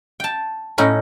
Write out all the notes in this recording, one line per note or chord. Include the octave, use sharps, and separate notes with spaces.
G5 A5
A2 C#4 D#4